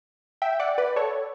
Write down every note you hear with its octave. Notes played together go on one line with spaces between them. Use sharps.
E5 G5
D5 F#5
B4 D5
A4 C#5